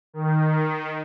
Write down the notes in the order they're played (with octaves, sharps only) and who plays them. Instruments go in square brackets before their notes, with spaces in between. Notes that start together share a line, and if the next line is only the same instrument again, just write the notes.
[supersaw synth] D#3